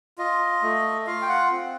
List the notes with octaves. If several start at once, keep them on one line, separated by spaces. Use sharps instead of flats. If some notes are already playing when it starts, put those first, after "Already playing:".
F4 D#5
A3
F4 F5
G5
F#5
C4